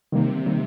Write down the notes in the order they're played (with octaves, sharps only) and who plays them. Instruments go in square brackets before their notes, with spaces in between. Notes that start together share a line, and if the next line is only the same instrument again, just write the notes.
[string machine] C3 [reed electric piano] D#3 G3 A#3
[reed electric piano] D#3 G3 A#3